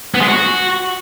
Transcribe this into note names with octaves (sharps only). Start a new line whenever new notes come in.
B3
G#3
F#4